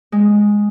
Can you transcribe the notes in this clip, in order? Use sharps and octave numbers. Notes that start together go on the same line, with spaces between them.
G#3